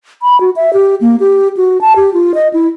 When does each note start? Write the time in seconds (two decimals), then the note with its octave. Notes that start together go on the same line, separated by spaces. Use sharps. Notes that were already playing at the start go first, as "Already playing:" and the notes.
0.22 B5
0.40 F#4
0.56 E5
0.73 G4
1.01 A#3
1.20 G4
1.57 F#4
1.81 A5
1.96 G4
2.14 F4
2.34 D#5
2.53 E4